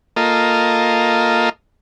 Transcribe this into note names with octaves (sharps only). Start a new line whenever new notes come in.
A#3 F4 A4 D#5